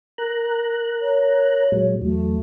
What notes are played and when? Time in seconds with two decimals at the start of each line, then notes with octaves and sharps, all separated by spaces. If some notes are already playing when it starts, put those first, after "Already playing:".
0.18 A#4 A#5 F#6
1.02 C#5
1.72 A#2 F#3 G#3
2.02 E2 F#3 A3